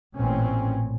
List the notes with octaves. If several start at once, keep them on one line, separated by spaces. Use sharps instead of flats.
A1 A#2 C4 C#4